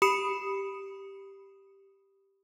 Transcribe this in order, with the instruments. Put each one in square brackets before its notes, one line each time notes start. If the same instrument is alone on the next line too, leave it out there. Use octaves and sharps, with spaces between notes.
[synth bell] G4 B5 D#6 C#7 E7